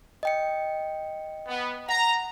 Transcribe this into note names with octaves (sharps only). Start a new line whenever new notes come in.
D#5 G5 C#7
B3
F#5 A#5